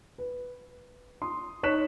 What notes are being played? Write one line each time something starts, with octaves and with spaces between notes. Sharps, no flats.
B4
C6 D#6
D#4 C#5 C#6 F#6 B6 E7